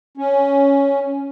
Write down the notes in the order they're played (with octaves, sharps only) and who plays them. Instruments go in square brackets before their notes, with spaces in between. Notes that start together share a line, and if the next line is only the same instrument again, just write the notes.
[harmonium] C#4